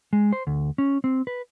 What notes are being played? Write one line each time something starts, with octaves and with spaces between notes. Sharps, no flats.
G#3
C5
D2
C#4
C4
B4